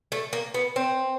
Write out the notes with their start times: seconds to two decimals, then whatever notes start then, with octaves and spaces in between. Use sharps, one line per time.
0.12 A3
0.33 A#3
0.54 B3
0.76 C4